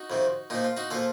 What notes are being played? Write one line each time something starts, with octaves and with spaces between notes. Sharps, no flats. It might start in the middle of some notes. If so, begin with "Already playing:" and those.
Already playing: D#4 F#4
F2 C3 D#3
A#2 F3 D#4
F4
D#4 F#4
A#2 F3 F4 A4